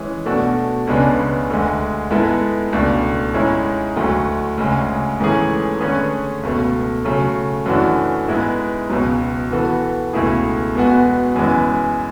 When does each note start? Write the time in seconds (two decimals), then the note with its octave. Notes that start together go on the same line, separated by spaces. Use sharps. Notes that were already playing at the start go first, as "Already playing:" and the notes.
Already playing: E3 G#3 C#4 G#4
0.25 B2 A3 D4 F#4 A4
0.87 C#2 C#3 G#3 B3 D4
1.50 D2 D3 G#3
2.11 G#2 G#3 B3 E4 A4
2.73 C#2 B2 A3 D4
3.34 G#2 G#3 C#4 E4
3.96 D2 D3 F#3 A3
4.58 D2 C#3 G#3
5.20 G#2 E3 A3 C#4 G#4
5.81 D3 A3 C#4 G#4 B4
6.43 C#2 B2 A3
7.04 C#3 F#3 A3
7.66 F#2 E3 A3 D4 F#4
8.28 G#2 G#3 B3 E4
8.90 C#2 B2 F#3
9.51 E3 B3 F#4 A4
10.13 C#2 B2 A3 E4 G#4
10.75 E2 B2 G#3 B3 F#4
11.36 F#2 E3 G#3 B3